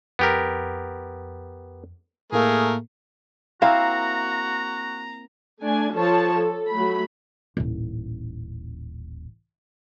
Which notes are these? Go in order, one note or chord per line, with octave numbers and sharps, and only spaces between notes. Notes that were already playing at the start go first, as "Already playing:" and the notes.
F2 B3 G4 A#4
A2 A3 A#3 G#4 A#4
A#3 C4 E4 F#4 F5 A#5
A3 D4 G#5
F3 A4 C#5 A5
A4
F#3 A3 B5
D#1 A1